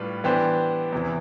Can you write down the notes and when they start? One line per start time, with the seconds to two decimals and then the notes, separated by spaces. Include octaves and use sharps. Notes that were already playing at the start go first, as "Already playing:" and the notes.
Already playing: A2 G3 D4 F4 B4
0.24 E3 B3 D4 G4 C5
0.93 E2 C3 E3